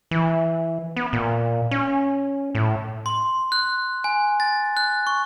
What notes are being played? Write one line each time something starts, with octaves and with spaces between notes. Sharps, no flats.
E3
B3
A#2
C#4
A2
C6
F#6
G#5
A6
F#6
C#6